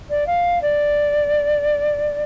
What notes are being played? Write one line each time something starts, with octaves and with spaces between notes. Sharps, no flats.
D5
F5
D5